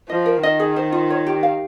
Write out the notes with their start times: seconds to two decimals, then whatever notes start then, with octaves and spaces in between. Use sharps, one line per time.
0.09 F3 D#5
0.26 A#4
0.43 D#3 D#5
0.60 G#4
0.76 C5
0.92 F4
1.10 C#5
1.27 G4
1.43 F5